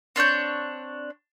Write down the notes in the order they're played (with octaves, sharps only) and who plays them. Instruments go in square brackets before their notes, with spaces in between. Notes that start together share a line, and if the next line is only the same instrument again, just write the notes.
[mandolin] C4 D4 C#5 G6